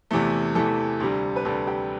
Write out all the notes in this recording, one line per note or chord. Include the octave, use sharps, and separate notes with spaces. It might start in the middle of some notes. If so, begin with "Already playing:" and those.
E2 C3 E3 A3
E2 C3 E3 A3 A4
D2 C3 G3
B4
D2 C3 G3 A4
G4